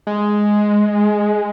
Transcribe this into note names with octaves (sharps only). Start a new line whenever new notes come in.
G#3